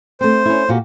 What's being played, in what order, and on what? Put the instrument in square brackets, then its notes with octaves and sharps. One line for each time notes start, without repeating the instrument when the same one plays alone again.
[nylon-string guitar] A3 C4 [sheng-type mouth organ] C5
[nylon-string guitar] C#4 E4
A#2 F#4 G4